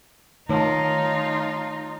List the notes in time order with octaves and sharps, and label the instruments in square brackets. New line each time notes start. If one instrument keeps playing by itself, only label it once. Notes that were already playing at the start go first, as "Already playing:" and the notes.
[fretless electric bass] D#3 [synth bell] A3 C#5 A5 [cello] D#4 [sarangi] F4